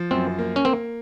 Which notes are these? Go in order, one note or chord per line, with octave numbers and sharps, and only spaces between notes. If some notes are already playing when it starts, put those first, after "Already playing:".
Already playing: F3
F#2 C4
A#3
C#4
A#3 C4